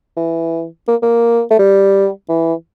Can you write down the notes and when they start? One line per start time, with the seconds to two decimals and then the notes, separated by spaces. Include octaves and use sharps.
0.17 E3
0.88 A#3
1.02 A#3
1.50 A3
1.59 G3
2.29 E3